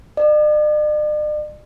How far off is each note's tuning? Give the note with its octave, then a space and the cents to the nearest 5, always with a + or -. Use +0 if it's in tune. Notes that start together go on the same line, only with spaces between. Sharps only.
D5 +45